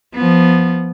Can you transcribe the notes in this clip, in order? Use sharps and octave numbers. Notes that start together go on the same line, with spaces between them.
F3 B3